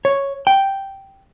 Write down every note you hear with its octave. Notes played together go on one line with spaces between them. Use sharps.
C#5
G5